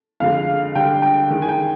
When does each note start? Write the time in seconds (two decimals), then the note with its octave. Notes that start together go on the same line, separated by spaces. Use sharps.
0.20 F2 D3 G#3 F5
0.75 D3 G3 D4 G5
1.02 G5
1.30 D#3 G#3 D#4
1.42 G#5
1.49 G5